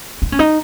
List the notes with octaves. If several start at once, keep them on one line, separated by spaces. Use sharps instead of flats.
D#4
C#4
D#4